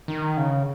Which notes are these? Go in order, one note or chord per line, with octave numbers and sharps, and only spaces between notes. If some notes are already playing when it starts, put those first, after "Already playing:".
D#3
C#3